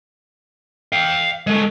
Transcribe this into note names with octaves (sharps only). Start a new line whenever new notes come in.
F5 G5
G#3 A3